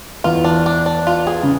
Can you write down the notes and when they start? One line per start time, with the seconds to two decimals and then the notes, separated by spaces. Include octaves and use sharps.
0.24 E2 E3 F4
0.44 D4
0.66 D4
0.86 D4
1.07 F4
1.27 G#4
1.43 C#3